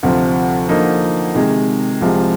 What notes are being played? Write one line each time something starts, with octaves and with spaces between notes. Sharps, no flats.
D2 C3 F3 C4
D3 F3 A#3 D#4
C3 D#3 G#3
C2 C3 F3 G#3